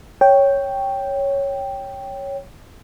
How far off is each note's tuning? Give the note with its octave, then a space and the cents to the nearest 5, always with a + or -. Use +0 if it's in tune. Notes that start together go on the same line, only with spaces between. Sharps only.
C#5 +0 G5 +0